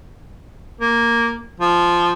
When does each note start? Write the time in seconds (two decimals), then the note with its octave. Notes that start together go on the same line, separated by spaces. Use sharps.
0.81 A#3
1.60 F3